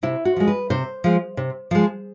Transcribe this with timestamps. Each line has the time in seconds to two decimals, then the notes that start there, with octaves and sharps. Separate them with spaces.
0.03 C3 E4
0.25 F#4
0.36 F3 G#3
0.47 B4
0.70 C3 C5
1.04 F3 G#3
1.37 C3
1.71 F3 G#3